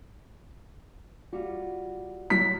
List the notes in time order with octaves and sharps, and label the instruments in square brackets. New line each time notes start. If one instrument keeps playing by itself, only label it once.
[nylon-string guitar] G3 F4 F#4
[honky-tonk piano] A2 F#3 [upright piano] B6